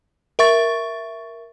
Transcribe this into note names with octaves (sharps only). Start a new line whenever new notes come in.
A#4 E5 C#6 A6